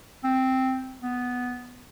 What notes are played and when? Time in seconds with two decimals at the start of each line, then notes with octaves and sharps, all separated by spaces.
0.24 C4
1.02 B3